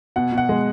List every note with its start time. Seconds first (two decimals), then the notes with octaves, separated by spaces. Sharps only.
0.16 B2 F#5
0.32 B2
0.38 F#5
0.49 G#3